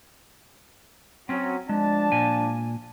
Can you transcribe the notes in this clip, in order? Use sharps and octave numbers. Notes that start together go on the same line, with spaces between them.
F#3 C4 C#4
F3 G#3 D4 A5
A#2 G#5